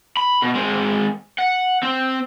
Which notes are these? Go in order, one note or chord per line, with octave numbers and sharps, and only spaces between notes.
B5
B2
G#3 C4
F#5
C4